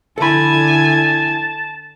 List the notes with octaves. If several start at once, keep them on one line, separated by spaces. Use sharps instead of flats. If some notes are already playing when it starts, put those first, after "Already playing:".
D3 E4 A4 G#5 A5 B5